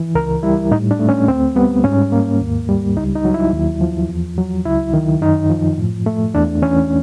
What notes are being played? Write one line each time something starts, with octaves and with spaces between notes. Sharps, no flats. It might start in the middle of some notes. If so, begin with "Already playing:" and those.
Already playing: E3
C#2 A#4
G3 E4
A2 D#4
D4
A3
C#4
D2 C4
G3 B3
G#2 C#4
A#3
D#2
G3
C#2 D#4
D#4
F#3
E4
D#2
F3
E2
F#3
C#2 E4
D#3
F#2 D#4
F3
A2
A3
E2 D4
E3 C#4